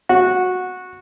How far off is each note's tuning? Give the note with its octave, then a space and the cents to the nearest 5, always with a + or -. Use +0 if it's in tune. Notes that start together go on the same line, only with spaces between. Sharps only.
F#4 -15